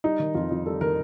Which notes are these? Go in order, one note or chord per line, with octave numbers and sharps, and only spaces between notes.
G3 D#4
D#3
F2 F4
F2
G3 A4
D#3 A#4